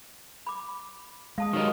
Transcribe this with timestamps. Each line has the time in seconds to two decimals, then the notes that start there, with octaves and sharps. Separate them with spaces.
0.47 B5 D6
1.38 G#3 F5 A5 D#6
1.53 D#3 F#3 D#4 G4 D#5